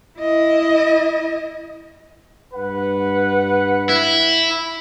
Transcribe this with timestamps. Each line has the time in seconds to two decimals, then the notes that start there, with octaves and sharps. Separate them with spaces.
0.19 E4 D#5
2.54 G2 B4 F#5
3.89 E4